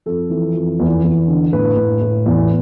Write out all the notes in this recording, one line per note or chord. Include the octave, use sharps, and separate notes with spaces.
F2 A4
E3
F2
E2
E2
D3
A2 B4
A2
A2
E2